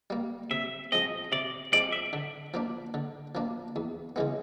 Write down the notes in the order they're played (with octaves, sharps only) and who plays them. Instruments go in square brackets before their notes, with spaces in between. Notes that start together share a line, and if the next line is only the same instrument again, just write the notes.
[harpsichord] G3 A#3
[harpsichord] C3 [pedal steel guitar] E5
[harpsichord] F3 G#3 C4 [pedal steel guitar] D#5
[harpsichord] C3 [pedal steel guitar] D5
[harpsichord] F3 G#3 C4 [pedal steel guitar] D5
[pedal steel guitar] E5
[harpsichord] D3
F3 A#3 D4
D3
F3 A#3 D4
E2
C#3 E3 G#3 B3